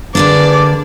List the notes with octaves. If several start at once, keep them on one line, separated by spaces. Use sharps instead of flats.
D3 A#3 D4 G#4 B4 D5